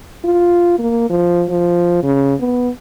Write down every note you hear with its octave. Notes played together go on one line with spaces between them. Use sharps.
F4
A#3
F3
F3
C#3
B3